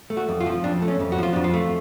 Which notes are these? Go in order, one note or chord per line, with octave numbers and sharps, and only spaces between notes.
A3
F#4
F2
F4
F3
F2 D4
A3
C#4
F2
F#4
F3 F4
F2 D4
F4
A3